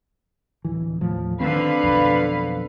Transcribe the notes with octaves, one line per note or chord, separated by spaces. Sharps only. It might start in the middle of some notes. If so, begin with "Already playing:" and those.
D1 E3
D#2 A2 F3
D3 D#3 C4 B4 F5
B1 F2